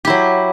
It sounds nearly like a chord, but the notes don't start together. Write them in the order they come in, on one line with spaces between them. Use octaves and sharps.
G4 E4 F#3